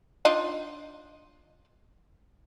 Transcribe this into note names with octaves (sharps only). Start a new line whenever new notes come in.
D4 D#4 F4